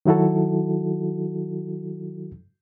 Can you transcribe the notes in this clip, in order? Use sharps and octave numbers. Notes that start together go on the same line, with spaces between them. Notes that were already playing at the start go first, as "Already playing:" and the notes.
D#3 F#3 E4 F#4 A4